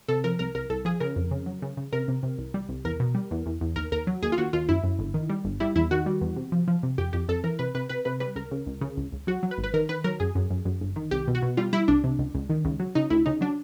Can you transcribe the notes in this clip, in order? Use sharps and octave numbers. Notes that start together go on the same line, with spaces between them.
C3 A4
F3 A#4
C2 A#4
C2 A#4
C2 A4
F3 G#4
C#3 A#4
F2
C#3
F#3
C#3
C#3
C3 A#4
C3
C3
C2
G3
C2
E2 A#4
B2
G3
E2
E2
E2
D#2 A#4
D#2 A#4
F#3
D#2 G#4
F4
D#2 F#4
D#2 F4
F#2 E4
F#2
G1
D#3
G3
G1
G3 E4
E2 E4
D#3 F#4
G3
E2
C3
F3
F3
C3
F2 G4
F2 G4
F2 A4
E3 A#4
C3 B4
C3 B4
C3 B4
C3 B4
G3 B4
C#2 A#4
C#3
C#2
C#3
C#2
C#2
F#3 F#4
F#3
B4
G#1
B4
D#3 A#4
D#3 B4
F#3 A#4
F#2 G#4
F#2
F#2
F#2
G1
D#3
C2 G4
B2
F#4
B2
G3 F4
G3 E4
C2 D4
C3
C#2
C#2
D#3
C#2
F#3
C#3 D#4
D2 E4
C#3 D#4
F#3 D4